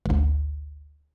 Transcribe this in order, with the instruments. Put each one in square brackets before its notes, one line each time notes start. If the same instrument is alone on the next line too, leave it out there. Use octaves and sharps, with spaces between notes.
[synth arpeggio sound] G#1 D2